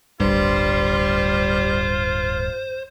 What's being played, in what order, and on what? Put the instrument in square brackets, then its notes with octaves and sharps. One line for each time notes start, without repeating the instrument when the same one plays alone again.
[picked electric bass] D1 G1 G2 [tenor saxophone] G3 [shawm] F4 [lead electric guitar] C5